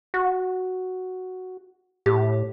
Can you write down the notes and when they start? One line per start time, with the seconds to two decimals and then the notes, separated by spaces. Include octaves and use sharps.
0.14 F#4
2.06 A2 G4